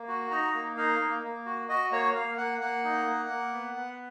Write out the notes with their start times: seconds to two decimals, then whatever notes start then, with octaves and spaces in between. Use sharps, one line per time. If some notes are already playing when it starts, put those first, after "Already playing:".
Already playing: A#3
0.08 F#4
0.31 D#4 A#5
0.54 A#3
0.77 D#4 F5
1.00 A#3
1.24 A#3
1.46 F#4
1.69 F#4 D#5
1.92 A#3 C#5
2.15 A#3 F5
2.38 A#3 F#5
2.61 A#3 F#5
2.84 D#4
3.06 A#3
3.29 A#3
3.53 B3
3.76 B3